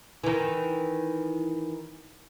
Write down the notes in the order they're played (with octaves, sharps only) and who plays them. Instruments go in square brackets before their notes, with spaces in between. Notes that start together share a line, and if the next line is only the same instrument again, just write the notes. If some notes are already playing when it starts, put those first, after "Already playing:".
[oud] D#3 E3